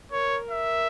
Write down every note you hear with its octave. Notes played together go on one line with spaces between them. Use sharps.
A#4 C#5
E5